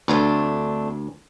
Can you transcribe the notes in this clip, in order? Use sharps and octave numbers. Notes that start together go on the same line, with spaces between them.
D2 A3 C4 D4